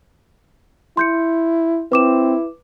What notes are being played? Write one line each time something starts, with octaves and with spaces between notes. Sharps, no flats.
E4 C6 G6 C#7
C4 E4 B4 D6 E7